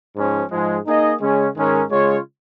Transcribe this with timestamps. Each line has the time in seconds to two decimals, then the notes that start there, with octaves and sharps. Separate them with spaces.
0.15 G#2 F3 C#4
0.51 G#2 F3 G#3
0.86 A#3 D#4 G#4 D#5
1.20 C#3 G#3 C#4
1.55 G#2 D#3 G#3 C#4 A#4
1.90 C#3 G#3 F4 C#5